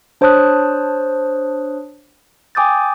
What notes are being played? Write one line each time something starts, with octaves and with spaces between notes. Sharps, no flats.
D4 C5 C#5 A5 D#6 F#6
G5 G#5 D6 D#6 G6 A6